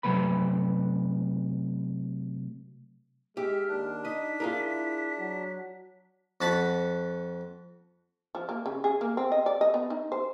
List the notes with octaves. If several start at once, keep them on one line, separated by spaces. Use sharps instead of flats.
C3 F#3 A3 B4 B5
G#3 G4 E5 F6
D#2 D4
D#4 D#5 B6
E4 F4 G#4 A#4
F#3
F2 F#4 A5 B5
F3
A#3
C#3
G#4
A#3
C4
D#5
D5
D#5
B3
D#4
C5